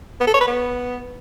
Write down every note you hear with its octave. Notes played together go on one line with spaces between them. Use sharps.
B3
A4
C#5
B4
B3